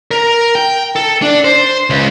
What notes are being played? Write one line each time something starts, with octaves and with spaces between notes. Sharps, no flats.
A#4
G5
A4
D4
C5
C#2